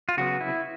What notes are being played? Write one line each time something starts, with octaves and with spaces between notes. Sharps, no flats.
F4
C#3 F#3 B3 F#4
E4